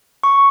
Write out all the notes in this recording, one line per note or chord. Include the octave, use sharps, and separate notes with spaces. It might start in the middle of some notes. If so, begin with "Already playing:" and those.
C#6